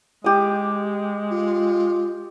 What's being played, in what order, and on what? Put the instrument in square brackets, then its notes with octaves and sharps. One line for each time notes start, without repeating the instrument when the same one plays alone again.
[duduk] G#3 [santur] G4 D#6
[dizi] F4